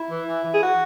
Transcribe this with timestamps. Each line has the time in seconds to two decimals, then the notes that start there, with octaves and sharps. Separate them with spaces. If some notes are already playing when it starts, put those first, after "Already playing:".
Already playing: E4
0.10 E3
0.27 E3
0.44 E3
0.52 G#4
0.61 F#4